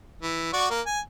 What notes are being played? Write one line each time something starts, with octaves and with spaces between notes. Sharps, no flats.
E3
F#4 D5 C#6
A#3
G#5